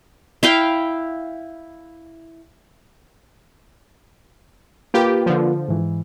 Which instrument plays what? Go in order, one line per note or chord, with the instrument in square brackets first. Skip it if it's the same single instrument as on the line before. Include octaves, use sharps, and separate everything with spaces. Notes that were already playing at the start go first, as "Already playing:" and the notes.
[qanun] E4 F5 G5
[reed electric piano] A#3 F4 B4 [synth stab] G4
[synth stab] D3 F3
[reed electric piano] G#2 E3